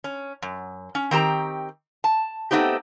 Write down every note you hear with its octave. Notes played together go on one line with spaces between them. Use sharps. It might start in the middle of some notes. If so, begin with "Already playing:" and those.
C#4
F#2
C#4
D#3 C4 G4 A#5
A5
A3 B3 C4 D#4 G4